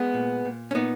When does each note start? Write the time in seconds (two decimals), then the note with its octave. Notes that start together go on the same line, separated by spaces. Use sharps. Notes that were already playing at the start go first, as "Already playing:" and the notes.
Already playing: G#3 B3
0.14 A#2
0.45 A#2
0.71 C#4
0.75 A#2 B3 D#4